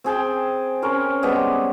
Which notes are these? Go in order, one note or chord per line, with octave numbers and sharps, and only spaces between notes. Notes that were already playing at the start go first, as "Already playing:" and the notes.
C4 G#4 G5 A5
C#4 A#4 C5
G3 G#3 B3 G4